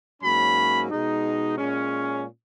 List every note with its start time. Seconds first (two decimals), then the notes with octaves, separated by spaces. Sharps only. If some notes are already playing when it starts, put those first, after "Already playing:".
0.22 G#2 F#3 A#3 C#4 B5
0.90 B2 G#3 D#4
1.58 A#2 G#3 C#4